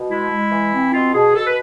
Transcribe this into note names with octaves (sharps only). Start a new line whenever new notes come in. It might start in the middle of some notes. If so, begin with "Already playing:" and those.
Already playing: B2
G#3 E4
G#3
E3
C4
B2 F4
B2 G#4
B2 A4
B4